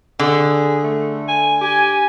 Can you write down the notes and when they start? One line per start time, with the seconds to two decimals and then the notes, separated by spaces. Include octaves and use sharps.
0.19 D3 G#4
0.84 A3
1.28 G#5
1.61 G4 G#5